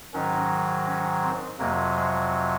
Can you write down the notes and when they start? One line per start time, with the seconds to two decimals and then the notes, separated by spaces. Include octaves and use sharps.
0.14 G#2 D#3 F#3 C#4
0.86 C#4
1.22 C4
1.59 F2 C3 F#3 A#3
1.96 G#3